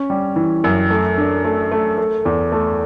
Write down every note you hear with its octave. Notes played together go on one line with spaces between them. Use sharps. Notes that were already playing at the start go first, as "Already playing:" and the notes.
Already playing: C#4
G3
E3
F#2
A3
D4
A3
A3
A3
E2
A3